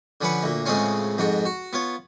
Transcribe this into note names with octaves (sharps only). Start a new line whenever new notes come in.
D3 F3 C#4 B4 F#5
D2 A#2
A2 C#3 G#3 C4 C#4 F4
F2 G#2 F#4
F#4
B3 F4 C#5